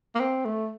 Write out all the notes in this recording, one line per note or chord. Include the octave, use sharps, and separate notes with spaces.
A#3
C4
A3